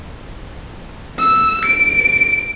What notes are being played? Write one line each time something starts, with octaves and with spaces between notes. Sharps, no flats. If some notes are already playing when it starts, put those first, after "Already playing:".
E6
D7